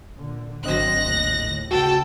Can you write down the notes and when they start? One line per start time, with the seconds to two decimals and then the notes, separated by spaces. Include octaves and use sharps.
0.15 A#2 D3
0.64 G#1 D3 F#3 C4 D#5 F#6 A#6
1.01 D#2 A2
1.71 C#2 F#4 A4 G5